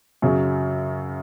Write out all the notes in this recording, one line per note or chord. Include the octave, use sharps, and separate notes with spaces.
F#2 C#3 F#3